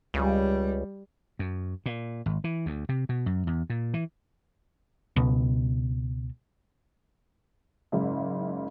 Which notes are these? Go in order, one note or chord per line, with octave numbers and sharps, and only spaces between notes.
C#2 G3
F#2
A#2
G#1
E3
D2
C3
B2
F#2
E2
A#2
E3
C#2 B2
F#1 G#2 C#3 E5